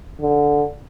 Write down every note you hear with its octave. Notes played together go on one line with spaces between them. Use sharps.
D3